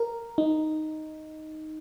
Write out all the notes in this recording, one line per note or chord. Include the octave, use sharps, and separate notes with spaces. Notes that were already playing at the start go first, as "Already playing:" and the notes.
Already playing: A#4
D#4